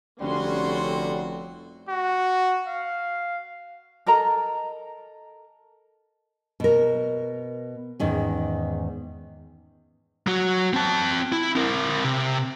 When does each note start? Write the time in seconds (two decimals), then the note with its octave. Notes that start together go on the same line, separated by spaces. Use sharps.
0.21 F1 D3 G3 C#4 F#4 C6
1.89 F#4
2.68 F5
4.07 A4 A#4 D#5 A#5
6.60 B2 A#4
8.00 E2 G#2 D#3 C#4
10.27 F#3 F#4
10.74 C4 A5
11.32 E4
11.55 C4 A#4
12.04 C3